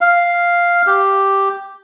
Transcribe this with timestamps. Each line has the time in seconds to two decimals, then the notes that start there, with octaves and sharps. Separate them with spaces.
0.01 F5
0.87 G4